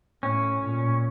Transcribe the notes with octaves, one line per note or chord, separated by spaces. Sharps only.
A2 C#4
A#2